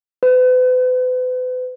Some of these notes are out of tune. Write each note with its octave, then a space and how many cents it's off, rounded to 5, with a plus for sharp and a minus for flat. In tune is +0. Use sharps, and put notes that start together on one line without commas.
B4 +40